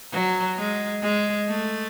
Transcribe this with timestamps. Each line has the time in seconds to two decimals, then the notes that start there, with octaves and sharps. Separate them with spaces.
0.13 F#3
0.58 G#3
1.03 G#3
1.48 A3